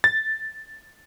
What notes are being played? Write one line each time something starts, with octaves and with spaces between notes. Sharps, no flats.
A6